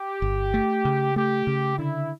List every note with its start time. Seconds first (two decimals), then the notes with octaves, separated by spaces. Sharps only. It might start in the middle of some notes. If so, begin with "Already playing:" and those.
Already playing: G4
0.22 G1
0.54 A3
0.85 C#3
1.16 A3 G4
1.47 C#3
1.78 D3 E4